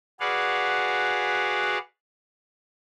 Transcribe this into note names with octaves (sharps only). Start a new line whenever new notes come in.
F#4 G#4 B4 D5 F5 F#5